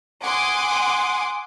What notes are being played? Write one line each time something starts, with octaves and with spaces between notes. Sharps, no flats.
F#5 G#5 C6 D6 D#6